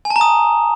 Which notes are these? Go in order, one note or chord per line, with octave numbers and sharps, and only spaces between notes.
G#5
A5
A#5
D#6